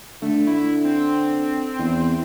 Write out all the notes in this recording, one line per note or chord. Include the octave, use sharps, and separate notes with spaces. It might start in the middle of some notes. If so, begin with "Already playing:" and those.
D3 A3
E4
C4
E2